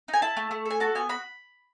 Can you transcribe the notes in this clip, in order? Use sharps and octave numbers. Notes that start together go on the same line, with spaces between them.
D#4
G#5
E4 A5
A3
A3
A4
G#5
F#4 A5
B3 G#5
F#4 B5